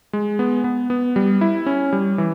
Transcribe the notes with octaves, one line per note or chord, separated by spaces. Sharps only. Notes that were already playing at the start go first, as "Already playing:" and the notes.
G#3
B3
B3
B3
G3
E4
C#4
G3
E3